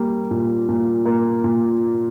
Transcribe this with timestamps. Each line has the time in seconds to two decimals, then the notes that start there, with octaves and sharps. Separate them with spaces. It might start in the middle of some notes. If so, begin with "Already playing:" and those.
Already playing: G3 A#3
0.31 A#2
0.69 A#2
1.05 A#3
1.44 A#2